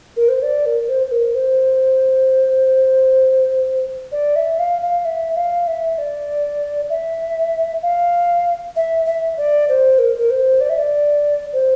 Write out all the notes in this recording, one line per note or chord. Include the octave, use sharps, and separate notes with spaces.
A#4
C5
D5
A#4
C5
C5
A#4
C5
D5
E5
F5
F5
E5
F5
E5
D5
E5
F5
E5
E5
D5
C5
A#4
A#4
C5
D5
E5
D5
C5